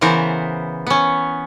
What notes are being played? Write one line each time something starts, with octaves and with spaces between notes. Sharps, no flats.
C#3 E3 B3 A#4 C5
B3 C#4